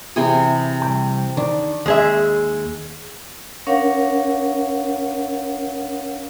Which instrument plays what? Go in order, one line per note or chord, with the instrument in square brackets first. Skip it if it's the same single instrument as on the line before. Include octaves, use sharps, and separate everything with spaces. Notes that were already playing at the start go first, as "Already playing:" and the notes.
[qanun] C3 E3 G#4
[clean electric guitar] C2 G5
[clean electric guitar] D#3 [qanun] D4
[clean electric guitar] D#2 [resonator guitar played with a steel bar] G#3 G#4 E5
[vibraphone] C#4 D4 A#4 C#5 F5 F#5